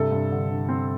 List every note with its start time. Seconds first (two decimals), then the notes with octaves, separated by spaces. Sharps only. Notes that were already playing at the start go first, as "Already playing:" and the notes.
Already playing: G2 C3 A4
0.12 G2
0.31 D3
0.50 D3
0.69 C4